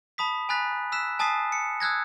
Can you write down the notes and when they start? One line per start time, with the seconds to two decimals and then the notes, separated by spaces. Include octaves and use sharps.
0.18 A5 B5 D#6 B6
0.49 G#5 A#5 B5 F#6 A6 B6
0.92 E6 F#6 B6 E7
1.19 G#5 A5 D#6 A6 B6 C7
1.52 C#7
1.80 D#6 E6 F#6 G#6 A#6